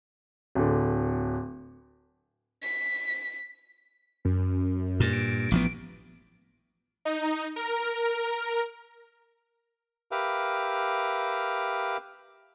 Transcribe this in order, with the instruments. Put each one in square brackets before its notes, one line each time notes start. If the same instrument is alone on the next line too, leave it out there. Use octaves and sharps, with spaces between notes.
[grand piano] D1 D3
[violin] B6
[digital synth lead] F#2
[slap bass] G2 A#2
[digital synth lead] D7
[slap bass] A1 F3 B3
[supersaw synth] D#4
A#4
[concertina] G4 A#4 B4 E5 F5